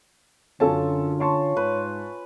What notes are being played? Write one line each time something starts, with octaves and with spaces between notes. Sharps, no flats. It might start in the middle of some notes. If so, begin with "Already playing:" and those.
F#2 D3 C#4 F4 A4 A5
C#5 A5 C6 C#6
G#2 B4